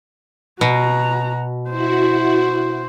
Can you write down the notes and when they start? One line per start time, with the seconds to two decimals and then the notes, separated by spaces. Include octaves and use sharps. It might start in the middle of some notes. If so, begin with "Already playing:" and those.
0.61 B2 F#4 A#5
1.70 E4 F#4 C5